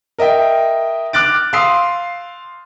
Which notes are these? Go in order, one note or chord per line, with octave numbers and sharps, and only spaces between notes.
A#4 D#5 E5 G5
D6 F6 F#6 A6 D7
F5 C6 D#6 E6 C7